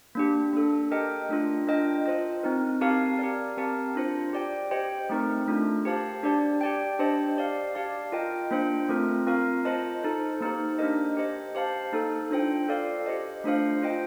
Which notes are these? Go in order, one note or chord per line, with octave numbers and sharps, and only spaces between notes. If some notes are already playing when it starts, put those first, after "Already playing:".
A#3 D4 G4
A#3 D4 A4
G4 A#4 D#5 G5
A3 D4 F4
D4 F4 A#4 D#5 G5
F4 C5 D#5
C4 D#4 A#4
C4 G4 A#4 F5 A5
G4 A#4 D5
C4 G4 A#4 F5 A5
D4 F4 C5
G4 D5 G5
G4 C5 D#5 G5
A3 C4 D#4 A#4
A3 D4 F4 A#4
G4 C5 F5 A5
D4 G4 D5 A5
G4 D5 G5
D4 G4 C5 D#5 A5
G4 D5 F5
G4 D5 F5 A5
F4 A#4 D#5 G5
A#3 D4 F4 C5 G5
A3 C4 F4 A#4
C4 F4 A#4 F5
F4 C5 D#5 A5
D#4 A4 C5
A#3 D#4 G4 C5
A#3 D4 G4 A#4 D#5
G4 C5 D#5
G4 C5 F5 A5
A#3 D#4 A4
D4 F4 C5 G5
F4 A4 D5 F5
G4 C5 D#5
A3 D4 F4 C5 F5
F4 C5 D#5 G5